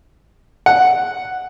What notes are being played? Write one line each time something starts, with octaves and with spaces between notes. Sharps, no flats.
F#5